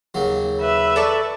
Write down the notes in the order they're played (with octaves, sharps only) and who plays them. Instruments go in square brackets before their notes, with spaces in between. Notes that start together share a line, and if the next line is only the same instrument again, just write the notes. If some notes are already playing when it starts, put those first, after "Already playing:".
[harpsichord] D#2 C#3 F#3
[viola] B4 E5
[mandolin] A4 D5 C#6